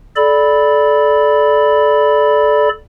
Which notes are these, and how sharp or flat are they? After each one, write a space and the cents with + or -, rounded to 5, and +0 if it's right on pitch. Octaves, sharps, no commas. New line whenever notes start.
A4 -25 D5 +0 B5 +0